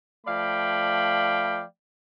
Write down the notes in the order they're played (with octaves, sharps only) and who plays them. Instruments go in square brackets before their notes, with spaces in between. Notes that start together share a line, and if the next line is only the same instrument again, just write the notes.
[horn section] F3 A3 D5 F5 G5 B5